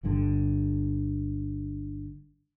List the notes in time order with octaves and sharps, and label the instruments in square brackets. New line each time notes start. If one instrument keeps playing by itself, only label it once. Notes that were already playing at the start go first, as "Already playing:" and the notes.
[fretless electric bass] G1 G2 D3